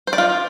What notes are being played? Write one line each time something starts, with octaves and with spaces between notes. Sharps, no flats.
C5
D5
F4